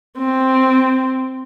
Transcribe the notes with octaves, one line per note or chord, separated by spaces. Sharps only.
C4